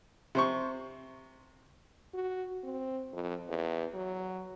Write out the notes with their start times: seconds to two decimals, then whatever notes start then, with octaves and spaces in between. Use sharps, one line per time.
0.35 C3 C5 C#6
2.14 F#4
2.64 C4
3.13 F2
3.48 E2
3.94 F#3